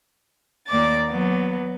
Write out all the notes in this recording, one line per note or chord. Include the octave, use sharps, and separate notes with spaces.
D#2 A#3 D5 D6 A6
F#3 B3